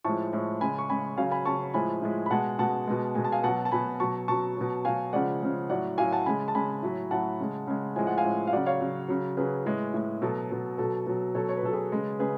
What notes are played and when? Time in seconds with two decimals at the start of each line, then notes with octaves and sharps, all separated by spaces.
0.05 A2 F3 G#3 A5 C#6
0.33 A2 F3 G#3
0.61 C#3 G#3 G#5 B5
0.79 C#6
0.90 C#3 G#3 G#5 B5
1.17 C#3 F#3 F5 G#5
1.32 G#5 B5
1.45 C#3 F#3 A5 C#6
1.74 A2 F3 G#3 G#5 B5
2.02 A2 F3 G#3
2.26 B5
2.30 B2 G#3 F#5 A5
2.59 B2 G#3 F#5 A5
2.87 B2 G#3
3.15 B2 G#3 G#5
3.24 A5
3.32 F5 G#5
3.43 B2 F#3 F#5 A5
3.65 A5
3.72 B2 F#3 G#5 B5
4.00 B2 F#3 A5 C#6
4.28 B2 F#3 A5 C#6
4.57 B2 F#3
4.85 B2 F#3 F5 G#5
5.13 C#3 F3 G#3 D5 F#5
5.42 C#3 F3 G#3
5.70 A2 F#3 D5 F#5
5.98 A2 F#3 F5 G#5
6.12 F#5 A5
6.26 C#3 G#3 G#5 B5
6.48 A5
6.55 C#3 G#3 G#5 B5
6.82 A2 F#3
7.11 A2 F#3 F#5 A5
7.40 C#3 G#3
7.67 C#3 G#3
7.96 A2 F3 G#3 G#5
8.07 F#5
8.18 F5 G#5
8.24 A2 F3 G#3
8.47 F5
8.53 C#3 F#3 D5 F#5
8.66 C#5 F5
8.81 C#3 F#3
9.08 C#3 F#3
9.37 C#3 F#3 G#4 B4
9.66 A2 G#3
9.94 A2 G#3
10.22 B2 F#3 A4
10.51 B2 F#3
10.78 B2 F#3 A4
11.06 B2 F#3
11.35 B2 F#3 A4 C#5
11.49 C#5
11.57 B4
11.63 B2 F#3 A4
11.73 G#4 B4
11.92 C#3 G#3
12.19 C#3 G#3 G#4 B4